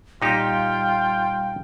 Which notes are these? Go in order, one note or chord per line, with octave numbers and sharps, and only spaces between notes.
A#2 G3 D#4 F4 G4 F5 G5